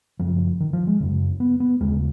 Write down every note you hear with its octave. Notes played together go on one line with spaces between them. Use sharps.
F#2 C#3 F3
D#3
F3
G#3
F#2 C#3
B3
B3
D#2 C#3 G#3